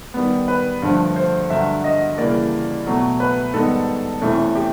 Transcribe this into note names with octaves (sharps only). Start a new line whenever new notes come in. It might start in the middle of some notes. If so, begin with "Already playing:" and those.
D#3 G3 B3
B4
G2 D3 F3 A3
C5
G2 D3 F#3 E5
D#5
C#3 E3 G3 A#3 D5
B2 F#3 A3
B4
G#2 D#3 G3 B3 D#4 A4
E2 C3 E3 A3 C#4
G4